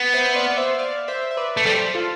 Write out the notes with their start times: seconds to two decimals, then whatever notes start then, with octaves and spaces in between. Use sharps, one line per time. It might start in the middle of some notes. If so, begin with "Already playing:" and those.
Already playing: B3
0.14 C5 E5
0.35 D5 F5
0.50 D5
0.57 C5 E5
0.78 D5 F5
1.08 C5 E5
1.31 E5
1.37 B4 D5
1.57 A3
1.65 G3 A4 C5
1.94 F4 A4